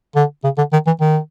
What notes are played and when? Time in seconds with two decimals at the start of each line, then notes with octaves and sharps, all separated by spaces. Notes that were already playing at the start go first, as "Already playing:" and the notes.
0.16 D3
0.44 C#3
0.58 D3
0.73 D#3
0.87 E3
1.01 D#3